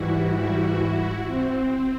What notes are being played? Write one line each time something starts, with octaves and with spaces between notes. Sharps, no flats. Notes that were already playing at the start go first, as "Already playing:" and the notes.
Already playing: G#2 E3 G3 E4 F#4
E4 F#4
C4